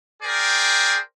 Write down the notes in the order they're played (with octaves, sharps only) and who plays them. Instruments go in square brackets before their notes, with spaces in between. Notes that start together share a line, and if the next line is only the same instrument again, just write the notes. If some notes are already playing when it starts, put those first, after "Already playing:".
[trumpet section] G#4 A#4 C5 D5 G5